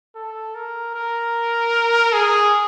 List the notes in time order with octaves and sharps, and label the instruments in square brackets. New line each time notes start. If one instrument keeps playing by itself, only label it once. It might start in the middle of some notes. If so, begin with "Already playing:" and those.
[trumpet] A4
A#4
A#4
G#4